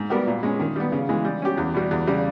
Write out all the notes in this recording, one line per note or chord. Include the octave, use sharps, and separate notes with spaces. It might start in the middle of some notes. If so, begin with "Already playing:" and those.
Already playing: G#2
G3 B3 G4 A#4
A#2
G#3 C#4
D#3
G3 B3
C#3
E3 G#3
G3
C#4 G4
E2
B2 G3
E2
C#3 G3